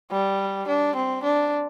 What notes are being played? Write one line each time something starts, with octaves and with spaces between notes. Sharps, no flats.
G3
D4
C4
D4